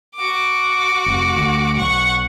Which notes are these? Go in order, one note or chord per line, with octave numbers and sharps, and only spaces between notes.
F#4 D6
F1
D2
B1 F#5 C#6